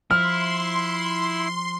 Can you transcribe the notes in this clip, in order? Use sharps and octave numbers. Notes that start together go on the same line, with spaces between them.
F3 E4 C6 F6